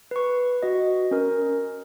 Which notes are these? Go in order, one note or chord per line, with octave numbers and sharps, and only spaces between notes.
B4 C#6
F#4 D#5
C#4 A#4